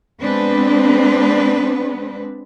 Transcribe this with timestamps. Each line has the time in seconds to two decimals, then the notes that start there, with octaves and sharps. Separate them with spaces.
0.21 G#3 B3 C4 D4 B4